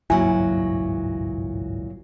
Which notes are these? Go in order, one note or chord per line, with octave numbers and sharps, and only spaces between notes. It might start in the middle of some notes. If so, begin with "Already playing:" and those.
G#1 C#2 G2 A#2 F#3 E4 G#5